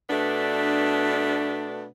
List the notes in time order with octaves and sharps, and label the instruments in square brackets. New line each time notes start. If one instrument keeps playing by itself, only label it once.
[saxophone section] B2 A3 B3 D4